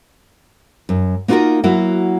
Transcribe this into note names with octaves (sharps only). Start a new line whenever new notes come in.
F#2
A#3 B3 D#4 F4 F#4 A#4
F#3 A#3 E4 F#4